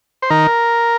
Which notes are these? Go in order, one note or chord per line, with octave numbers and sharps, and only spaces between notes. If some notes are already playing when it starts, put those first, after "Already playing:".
C5
D#3 A#4